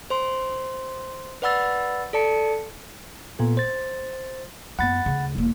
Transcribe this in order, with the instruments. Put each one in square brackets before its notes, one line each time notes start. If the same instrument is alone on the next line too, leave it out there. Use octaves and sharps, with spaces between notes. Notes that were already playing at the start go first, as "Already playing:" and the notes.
[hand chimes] C5 C6
B4 D5 F#5 B5 E6 A6
A4 D5 A5 C#7
[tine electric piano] A#2 B3 A4
C5 A6
[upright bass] F#2 B3 [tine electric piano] F#5 B5 A6
[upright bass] D2 C#3
E1 A#3